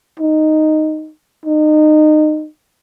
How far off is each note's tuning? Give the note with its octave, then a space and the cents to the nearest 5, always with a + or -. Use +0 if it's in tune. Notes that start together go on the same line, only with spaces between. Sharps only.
D#4 -5
D#4 -25